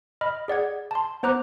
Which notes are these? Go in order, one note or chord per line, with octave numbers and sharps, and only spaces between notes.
D#5 B5 F6
G#4 D5 F#5 G#6
A5 C6
B3 C5 A#5 D6 F#6